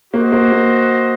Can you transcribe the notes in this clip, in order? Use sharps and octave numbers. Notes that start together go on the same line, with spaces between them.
A#3 F#4 C5 D#5
A#3
A#3